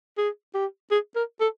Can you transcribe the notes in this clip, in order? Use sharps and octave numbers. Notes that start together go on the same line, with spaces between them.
G#4
G4
G#4
A#4
A4